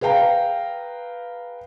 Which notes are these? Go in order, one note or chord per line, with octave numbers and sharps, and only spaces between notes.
G#4 B4 F5 G5 A#5